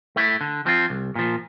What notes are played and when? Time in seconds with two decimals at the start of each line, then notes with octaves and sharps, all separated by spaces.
0.16 A3 E4
0.41 D3
0.66 F3 C4 F4
0.90 C2
1.15 A#2 F3